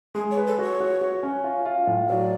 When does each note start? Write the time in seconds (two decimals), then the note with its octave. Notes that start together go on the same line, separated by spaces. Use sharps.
0.15 G#3 G#4
0.31 C#5
0.37 B4
0.47 A4
0.59 F#4
0.64 C#5
0.80 F#4
1.01 F#4
1.23 C#4
1.44 F4
1.65 F4
1.87 A2
2.09 F#3 D5